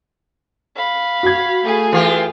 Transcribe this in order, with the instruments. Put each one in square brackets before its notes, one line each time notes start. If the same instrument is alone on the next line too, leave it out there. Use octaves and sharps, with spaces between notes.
[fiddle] F5 B5
[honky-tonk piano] F#4 G#6
[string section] A3 G#4
[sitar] E3 F4 G4